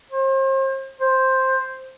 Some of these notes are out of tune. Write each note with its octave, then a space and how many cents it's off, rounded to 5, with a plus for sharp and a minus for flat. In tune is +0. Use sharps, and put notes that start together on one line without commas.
C5 +40
C5 +5